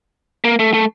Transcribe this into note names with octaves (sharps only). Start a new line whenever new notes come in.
A#3
A3
A3